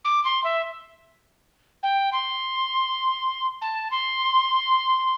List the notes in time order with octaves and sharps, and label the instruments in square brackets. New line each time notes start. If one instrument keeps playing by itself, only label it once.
[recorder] D6
C6
E5
G5
C6
A5
C6